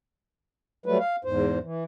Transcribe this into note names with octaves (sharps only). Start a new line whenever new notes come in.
F#3 G3 A3 B4
F5
E2 G#2 C5
E3